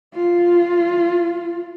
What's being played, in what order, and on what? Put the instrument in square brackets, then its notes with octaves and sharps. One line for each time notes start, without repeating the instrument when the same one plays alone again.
[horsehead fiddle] F4